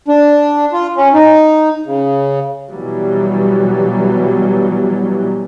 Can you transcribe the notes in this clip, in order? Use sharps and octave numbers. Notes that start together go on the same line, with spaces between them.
D4
F4
C#4
D#4
C#3
B2 E3 F#3 G3